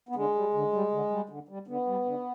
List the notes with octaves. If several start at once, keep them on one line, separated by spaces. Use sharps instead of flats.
B3
D3 G#3
G3
D3
G3
D3
G3
D3
G3
D3 B3
G3
D3